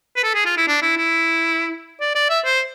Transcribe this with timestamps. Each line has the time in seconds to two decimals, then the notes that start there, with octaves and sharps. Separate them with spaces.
0.16 B4
0.23 A4
0.34 G#4
0.46 F4
0.57 E4
0.68 D4
0.82 E4
0.97 E4
2.01 D5
2.15 D5
2.30 E5
2.45 C5